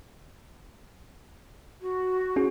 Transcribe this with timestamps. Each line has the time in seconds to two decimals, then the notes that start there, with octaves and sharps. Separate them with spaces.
1.81 F#4
2.36 C#4 F#4 G#4